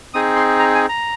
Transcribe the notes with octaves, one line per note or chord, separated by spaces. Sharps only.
C4 D#4 G#4 D#6
C6
A#5
G#5
A#5